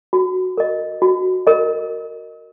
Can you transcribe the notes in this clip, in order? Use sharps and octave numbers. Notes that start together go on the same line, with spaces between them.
F#4
A#4 D#5
F#4
A#4 D#5